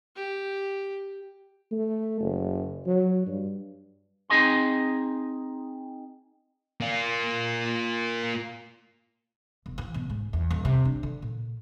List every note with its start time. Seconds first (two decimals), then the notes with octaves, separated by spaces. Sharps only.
0.16 G4
1.72 A3
2.21 F#1
2.87 F#3
3.27 G2
4.30 C4 D#4 G#4 D#5 G#5 C6
6.81 A#3 F4
9.66 E1
9.78 E3
9.94 B2
10.10 G#2
10.33 E2
10.51 D#1
10.65 C3
10.85 D4
11.03 D3
11.22 A#2